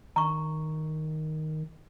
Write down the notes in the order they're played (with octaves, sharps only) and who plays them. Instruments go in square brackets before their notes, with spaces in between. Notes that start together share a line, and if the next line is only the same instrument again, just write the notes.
[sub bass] D#3 [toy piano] A#5 C#6